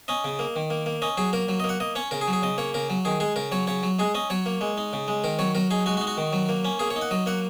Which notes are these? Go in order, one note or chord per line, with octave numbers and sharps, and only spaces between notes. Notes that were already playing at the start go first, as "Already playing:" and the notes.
C#4 D#5
C#3
A#3
D#3
A#3
A#3
C#4 D#5
F#3 G#4
A#3 A#4
F#3
D#5
A#3
F#5
A#3 D#5
C#4 C#5
C#3 A#4
G#4
F#3
G#4
C#3 D#5
A#3 C#5
C#3 A#4
F#3
D#3 G#4
G#3 G#4
C#3 A#4
F#3 C#5
C#3 C#5
F#3
G#3 G#4
C#4 D#5
F#3 C#5
A#3
G#3
D#4
C#3
G#3
D#3 A#4
F#3 C#5
F#3 A#4
D#4 G#4
G#3 F#4
F#4
D#4
F#4
D#3
F#3
A#3
C#4
A#3 G#4
C#5
D#4
F#5
F#3 D#5
A#3 F#5